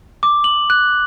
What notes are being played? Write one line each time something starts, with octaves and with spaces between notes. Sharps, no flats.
D6
F#7
F#6